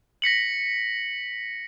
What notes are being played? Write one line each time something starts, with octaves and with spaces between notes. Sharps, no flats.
A#6 B6 C#7 F#7